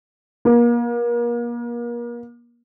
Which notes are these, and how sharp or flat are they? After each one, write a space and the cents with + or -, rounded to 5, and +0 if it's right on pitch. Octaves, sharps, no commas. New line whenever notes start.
A#3 +35